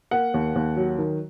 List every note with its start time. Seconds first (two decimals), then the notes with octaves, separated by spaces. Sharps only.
0.11 A#3 F#5
0.34 D#2
0.55 D#2
0.77 F#3
0.98 D#3